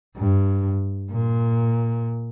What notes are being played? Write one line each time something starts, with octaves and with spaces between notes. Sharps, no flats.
G2
A#2